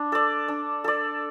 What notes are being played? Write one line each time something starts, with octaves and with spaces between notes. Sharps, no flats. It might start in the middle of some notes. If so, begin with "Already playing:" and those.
Already playing: D4
A4 D5
D4
A4 D5